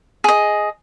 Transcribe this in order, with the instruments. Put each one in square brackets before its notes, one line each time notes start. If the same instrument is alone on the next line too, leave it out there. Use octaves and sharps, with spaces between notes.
[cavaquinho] G#4 D#5